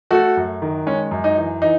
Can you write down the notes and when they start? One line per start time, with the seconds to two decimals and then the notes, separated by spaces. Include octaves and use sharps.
0.11 A3 F#4 A4
0.37 F#2
0.62 D#3
0.86 G#3 C#4
1.11 F#2
1.24 D#4
1.37 E3
1.62 E3 D#4